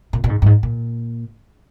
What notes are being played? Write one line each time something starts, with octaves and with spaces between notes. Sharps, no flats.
A#2
A#2
G#2
G2
G#2
A#2